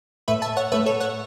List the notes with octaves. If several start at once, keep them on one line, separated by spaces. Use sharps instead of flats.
A2 A3 B4 E5
E5 A5
C#5 F#5
A2 A3 B4 E5
A4 C#5
C#5 F#5